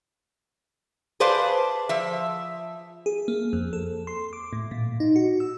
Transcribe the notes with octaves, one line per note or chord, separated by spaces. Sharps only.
G#4 B4 C5 D5 F5 A5
F3 E5
G#4
A#3
F2
A4
C6
D6
A2
A#2
D#4
F#4
E6